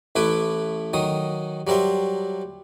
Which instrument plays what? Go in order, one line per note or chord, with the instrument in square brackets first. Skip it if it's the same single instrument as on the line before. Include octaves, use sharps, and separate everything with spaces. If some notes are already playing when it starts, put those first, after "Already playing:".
[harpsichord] A1 A3 E4 B4 D6
D#3 F#3 D#6
F#3 G3 A#4 C5 E5